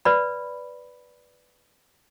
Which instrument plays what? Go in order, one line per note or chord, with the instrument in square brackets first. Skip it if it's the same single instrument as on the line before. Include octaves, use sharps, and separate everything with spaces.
[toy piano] B4 D5 B5